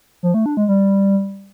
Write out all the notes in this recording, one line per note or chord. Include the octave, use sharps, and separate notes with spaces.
F3
A3
D4
G#3
G3